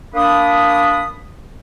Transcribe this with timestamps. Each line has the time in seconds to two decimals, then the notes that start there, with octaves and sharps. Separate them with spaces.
0.14 A#3 D4 B5 D#6